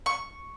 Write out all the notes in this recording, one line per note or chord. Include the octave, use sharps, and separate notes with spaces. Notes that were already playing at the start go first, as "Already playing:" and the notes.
C#6